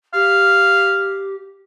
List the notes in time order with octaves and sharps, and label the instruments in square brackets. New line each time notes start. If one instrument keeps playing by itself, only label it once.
[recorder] G4 [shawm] F5